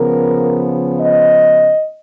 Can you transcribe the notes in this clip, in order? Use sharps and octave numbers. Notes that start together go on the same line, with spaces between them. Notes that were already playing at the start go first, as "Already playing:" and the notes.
Already playing: C#3 F3 B3 A#4
D#5